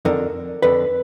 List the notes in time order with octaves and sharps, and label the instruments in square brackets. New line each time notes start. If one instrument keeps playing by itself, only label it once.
[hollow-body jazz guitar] F2 D3 A#4
F2 D3 B4